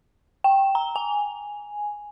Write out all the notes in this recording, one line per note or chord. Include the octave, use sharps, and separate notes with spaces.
G5
A#5
G#5